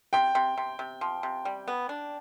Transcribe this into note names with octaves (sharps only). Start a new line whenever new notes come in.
C3 G5
C3
C3
C3
F3
C3
G3
B3
D4